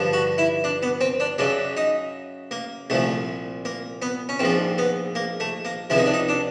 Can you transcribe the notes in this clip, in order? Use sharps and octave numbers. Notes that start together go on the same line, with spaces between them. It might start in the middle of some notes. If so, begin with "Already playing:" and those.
Already playing: G2 D3 F3
F#4
E4
D4
B3
C4
D4
F#2 C#3 F#3 D4
D#4
A#3
C2 A#2 F3 A3
A#3
B3
C#4
A#1 G#2 F3 C4
B3
A#3
A3
A#3
C#2 C3 F3 E4
D#4
D4
D#4
D4